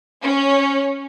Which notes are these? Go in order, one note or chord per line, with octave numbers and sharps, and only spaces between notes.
C#4